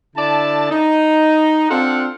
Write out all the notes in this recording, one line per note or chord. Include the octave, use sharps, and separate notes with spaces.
D3 E4 D5 A5
D#4
C4 D4 F4 A4 F5 F#5